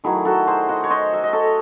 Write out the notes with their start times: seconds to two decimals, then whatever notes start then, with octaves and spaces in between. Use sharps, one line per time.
0.04 D#3 F#3 A3 E4 G#4
0.25 F#4 A4
0.47 G#4 C5
0.68 D#5 F#5
0.84 C#5
0.90 C5 D#5
1.14 E5
1.23 D#5
1.33 A4 C#5